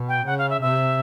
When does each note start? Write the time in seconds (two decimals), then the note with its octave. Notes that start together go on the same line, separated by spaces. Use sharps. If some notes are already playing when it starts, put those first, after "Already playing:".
Already playing: B2
0.09 G5
0.26 C#3 F#5
0.38 F5
0.50 E5
0.61 C3 E5